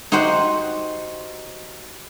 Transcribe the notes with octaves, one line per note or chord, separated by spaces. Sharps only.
D#4 F#4 G4 C5 F#5